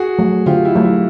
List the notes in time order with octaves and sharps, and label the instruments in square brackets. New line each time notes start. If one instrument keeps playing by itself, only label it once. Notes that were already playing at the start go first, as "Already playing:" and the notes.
Already playing: [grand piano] F#4 G#4
[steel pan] F#3 A3
[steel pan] D3 [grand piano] F4 G4
[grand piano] E4
[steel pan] F#3 A3 [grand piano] F4
[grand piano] E4